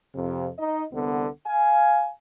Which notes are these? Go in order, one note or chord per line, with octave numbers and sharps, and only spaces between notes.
F2 C3
D#4 D#5
C2 D3 B3
F5 G#5